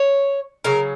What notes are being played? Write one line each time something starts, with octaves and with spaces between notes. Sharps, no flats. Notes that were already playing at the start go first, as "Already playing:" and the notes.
Already playing: C#5
C#3 F#3 A#4